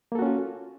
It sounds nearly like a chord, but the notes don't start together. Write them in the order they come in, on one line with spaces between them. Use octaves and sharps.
A#3 A4 F#4 C#4 F4